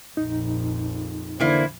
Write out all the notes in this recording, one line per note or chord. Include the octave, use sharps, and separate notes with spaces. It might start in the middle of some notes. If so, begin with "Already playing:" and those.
A#1 F2 D#4
D3 E3 A#3 E4 C5 D5